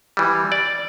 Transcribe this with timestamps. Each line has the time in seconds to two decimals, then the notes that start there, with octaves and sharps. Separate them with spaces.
0.17 E3 G3
0.52 D5